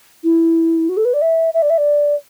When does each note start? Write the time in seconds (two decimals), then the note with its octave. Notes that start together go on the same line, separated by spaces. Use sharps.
0.24 E4
0.89 F#4
0.97 A4
1.04 B4
1.13 D5
1.21 E5
1.54 E5
1.62 D5
1.69 E5
1.77 D5